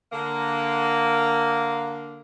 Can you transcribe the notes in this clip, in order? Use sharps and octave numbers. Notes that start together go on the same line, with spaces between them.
D3 A#3